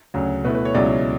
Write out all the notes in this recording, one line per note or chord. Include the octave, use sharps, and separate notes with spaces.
D2 C#3 F#3
B2 A3 E4 B4
B4
C#5
C#2 B2 F#3 C#4 E4 D5